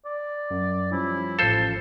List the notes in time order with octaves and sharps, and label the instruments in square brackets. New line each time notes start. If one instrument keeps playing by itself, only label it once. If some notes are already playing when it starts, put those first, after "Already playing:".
[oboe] D5
[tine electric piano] F#2
[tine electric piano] F3 G3 C#4 [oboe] E4
[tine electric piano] A1 F3 F5 [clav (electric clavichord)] A4 C5